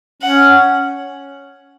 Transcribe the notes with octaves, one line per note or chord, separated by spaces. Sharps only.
C#4 F#5